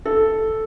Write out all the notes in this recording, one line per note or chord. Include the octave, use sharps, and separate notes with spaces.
A4